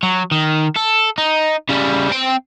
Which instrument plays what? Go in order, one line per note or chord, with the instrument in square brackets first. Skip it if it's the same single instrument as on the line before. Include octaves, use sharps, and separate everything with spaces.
[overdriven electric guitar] F#3
D#3
A4
D#4
C#3 G3
C4 G5